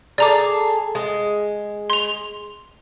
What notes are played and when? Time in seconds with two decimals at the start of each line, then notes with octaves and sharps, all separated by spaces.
0.18 G#4 A4 D5 A#5 D6
0.95 G#3
1.90 C6 F7